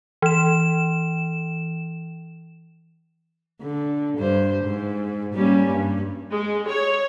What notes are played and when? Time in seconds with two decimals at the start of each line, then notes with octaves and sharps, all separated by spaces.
0.22 E3 E7
3.61 D3
4.18 G2 C5
4.64 G#2
5.34 G3 A#3 C#4
5.71 G2
6.32 G#3
6.69 C#5